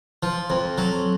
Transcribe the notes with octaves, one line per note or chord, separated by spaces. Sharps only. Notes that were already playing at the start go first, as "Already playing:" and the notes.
F3
F2
F#3